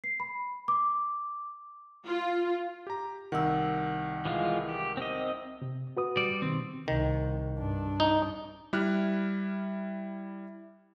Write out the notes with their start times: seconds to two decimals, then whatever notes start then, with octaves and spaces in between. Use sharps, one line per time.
0.04 C7
0.20 B5
0.68 D6
2.06 F4
2.87 G4 A#5
3.32 C2 D#3 F#5 E6
4.25 E3 G#3 F4
4.69 G4
4.97 C4 D#5
5.62 C3
5.97 F#4 B4 D#6
6.17 G3 D5
6.42 B2 D#3 C4
6.88 C2 D#3
7.59 G2 D4
8.00 D#4
8.73 G3 E4 F6 F#6